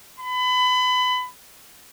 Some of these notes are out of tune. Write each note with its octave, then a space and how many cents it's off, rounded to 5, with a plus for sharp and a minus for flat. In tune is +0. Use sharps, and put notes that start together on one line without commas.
B5 +25